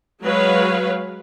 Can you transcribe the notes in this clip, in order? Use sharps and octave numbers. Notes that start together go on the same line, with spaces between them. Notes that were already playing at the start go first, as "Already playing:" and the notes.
F#3 G#3 B4 C#5 F5